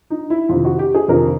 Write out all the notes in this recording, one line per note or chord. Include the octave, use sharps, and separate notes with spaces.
D#4
E4
F2 C3 D#3 F4
F#4
G4
G#4
F2 C3 D#3 A#4